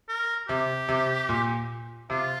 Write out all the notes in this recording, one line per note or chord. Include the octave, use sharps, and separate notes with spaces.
A#4
C3 G4
C3
A#2
C3 F4